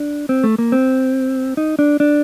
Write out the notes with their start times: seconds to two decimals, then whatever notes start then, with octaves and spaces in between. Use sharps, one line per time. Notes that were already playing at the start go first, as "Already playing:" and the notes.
Already playing: D4
0.29 C4
0.44 A3
0.58 A#3
0.72 C4
1.57 D#4
1.79 D4
2.00 D4